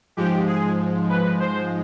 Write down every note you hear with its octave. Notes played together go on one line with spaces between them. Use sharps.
G#2 F3 G#3 G4
G#4
B4
C5